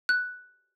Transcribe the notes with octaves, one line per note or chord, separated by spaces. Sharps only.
F#6